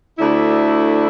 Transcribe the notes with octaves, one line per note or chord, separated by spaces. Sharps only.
D2 D3 A3 E4